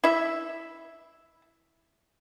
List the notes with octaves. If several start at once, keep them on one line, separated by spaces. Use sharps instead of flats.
E4 E5